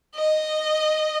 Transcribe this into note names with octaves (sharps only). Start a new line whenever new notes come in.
D#5